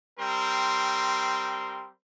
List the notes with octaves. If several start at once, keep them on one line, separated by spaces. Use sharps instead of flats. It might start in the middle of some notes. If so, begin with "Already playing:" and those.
G3 C4 A#4 C6